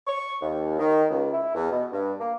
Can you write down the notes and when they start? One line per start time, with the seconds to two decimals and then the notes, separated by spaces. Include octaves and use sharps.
0.07 C#6
0.41 D#2
0.79 D#3
1.10 C#2
1.33 E4
1.55 E2
1.71 B2
1.92 G2
2.20 A#3